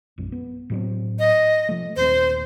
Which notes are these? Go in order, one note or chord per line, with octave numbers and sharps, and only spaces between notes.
A#1 F#2
B3
A2 F#3 C4
D#5
F3 A3
D#1 C4 C5